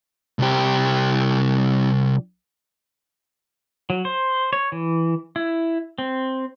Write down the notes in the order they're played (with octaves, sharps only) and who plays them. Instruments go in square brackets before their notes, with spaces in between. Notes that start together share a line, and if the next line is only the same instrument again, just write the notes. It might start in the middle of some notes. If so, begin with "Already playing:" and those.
[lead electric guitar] C2 G4
[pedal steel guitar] F#3
C5
C#5
E3
E4
C4